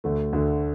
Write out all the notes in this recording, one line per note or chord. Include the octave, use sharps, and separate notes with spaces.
D2 D3 A3
D2 D3 A3